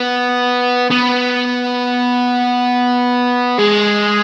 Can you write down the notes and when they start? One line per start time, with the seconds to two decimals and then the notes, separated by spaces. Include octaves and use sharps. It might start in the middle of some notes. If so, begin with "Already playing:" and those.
Already playing: B3
0.91 B3
3.59 G#3